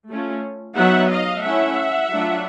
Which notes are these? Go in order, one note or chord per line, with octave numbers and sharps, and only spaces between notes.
A3 C#4 F4
F#3 B3 D#4 E5 F#5
D#5 F5
A3 C#4 E4 E5 F#5
F#3 A3 D4 F4